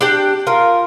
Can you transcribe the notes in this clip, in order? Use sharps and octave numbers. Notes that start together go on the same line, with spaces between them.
D4 G4 G5
F4 A#4